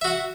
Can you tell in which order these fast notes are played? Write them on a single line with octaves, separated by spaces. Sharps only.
E5 F#4 F#5